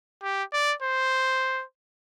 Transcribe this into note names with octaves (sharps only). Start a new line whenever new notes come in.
G4
D5
C5